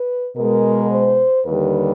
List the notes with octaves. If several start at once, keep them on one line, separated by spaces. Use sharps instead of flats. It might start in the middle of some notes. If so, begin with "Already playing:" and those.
Already playing: B4
B2 G#3 A#4
C5
D#2 D3 G3 B4